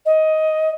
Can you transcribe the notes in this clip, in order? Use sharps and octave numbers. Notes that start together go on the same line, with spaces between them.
D#5